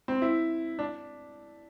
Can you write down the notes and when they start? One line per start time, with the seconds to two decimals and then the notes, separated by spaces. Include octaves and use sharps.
0.08 C4
0.22 E4
0.79 D4